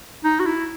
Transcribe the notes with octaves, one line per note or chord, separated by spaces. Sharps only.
D#4
F#4
E4